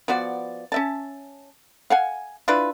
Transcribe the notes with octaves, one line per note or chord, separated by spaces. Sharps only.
F3 B3 F#4 D5
C#4 E5 A5
F5 F#5 G#5
D4 E4 F4 B4